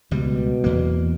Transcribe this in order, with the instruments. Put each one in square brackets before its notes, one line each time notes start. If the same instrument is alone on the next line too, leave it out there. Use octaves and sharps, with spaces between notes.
[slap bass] C#2 G3 [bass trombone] B2
[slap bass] E2 A#3